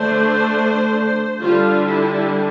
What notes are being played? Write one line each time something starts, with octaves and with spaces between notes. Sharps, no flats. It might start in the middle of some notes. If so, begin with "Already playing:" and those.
Already playing: D3 A3 D4 C5
D3 G3 D4 F4
E4